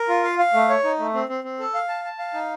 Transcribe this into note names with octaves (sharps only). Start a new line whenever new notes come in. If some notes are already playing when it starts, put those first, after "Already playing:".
Already playing: A#4
F4
F5
F5
A3
C#5
D#4
A3
C4
C4
C4
A4
F5
A5
A5
F5
D#4